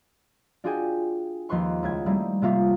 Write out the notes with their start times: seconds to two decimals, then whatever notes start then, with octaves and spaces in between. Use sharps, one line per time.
0.64 D4 F4 F#4 G#4 G5 G#5
1.49 D#2 F3 D#4 B4 C6 C#6
1.83 C#2 E4 G#6
2.06 G3 A3 A#3 C4 D#4 E4
2.42 C3 A#3 F4 E5